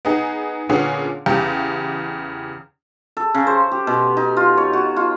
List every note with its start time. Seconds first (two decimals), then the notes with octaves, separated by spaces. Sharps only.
0.05 B3 D#4 G#4
0.69 A#2 D3 B3 C#4 G#4
1.26 E2 C#3 G4
3.17 A4
3.35 C#3
3.47 C5
3.72 G4
3.87 B2
4.17 D#4
4.37 F4
4.57 C#5
4.73 F#4
4.96 F4